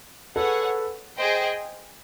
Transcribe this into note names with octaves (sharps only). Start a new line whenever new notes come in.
G#4 A4 B4 C#5 F#5
G#4 C5 D#5 G5